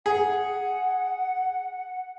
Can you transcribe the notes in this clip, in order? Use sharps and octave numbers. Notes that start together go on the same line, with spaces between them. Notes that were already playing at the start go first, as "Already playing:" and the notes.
G#4 F#5